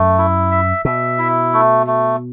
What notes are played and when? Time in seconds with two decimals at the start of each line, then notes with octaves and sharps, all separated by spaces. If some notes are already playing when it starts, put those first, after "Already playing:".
Already playing: F#2 A3
0.18 E4
0.52 E5
0.85 B2 E5
1.19 E4
1.53 A3
1.87 A3